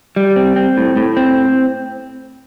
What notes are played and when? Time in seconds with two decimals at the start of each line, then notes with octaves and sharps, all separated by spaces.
0.16 G3
0.36 C4
0.56 C4
0.77 A2
0.96 A2
1.17 C4